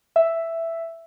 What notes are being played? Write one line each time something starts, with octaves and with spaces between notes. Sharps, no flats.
E5